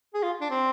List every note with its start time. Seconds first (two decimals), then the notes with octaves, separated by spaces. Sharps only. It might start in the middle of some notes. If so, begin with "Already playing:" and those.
0.14 G#4
0.23 F4
0.41 D4
0.50 C4